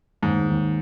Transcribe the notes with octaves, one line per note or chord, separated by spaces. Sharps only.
D#2 G#2
D#2